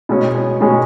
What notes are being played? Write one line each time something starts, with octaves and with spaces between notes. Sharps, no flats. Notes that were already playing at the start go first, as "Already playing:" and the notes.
B2 G#3 C#4
B2 G#3 C#4